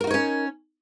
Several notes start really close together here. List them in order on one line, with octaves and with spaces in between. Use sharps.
A#4 F#4 D#4 C#5 C#4